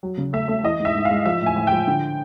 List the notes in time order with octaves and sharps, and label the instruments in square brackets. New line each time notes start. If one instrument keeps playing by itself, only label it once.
[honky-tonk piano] F#3
C#3
A3 E5
A3
E3 D#5
G#2
E5
G#2
F5
G#3
F3 E5
A2 G#5
A2
F3 G5
D3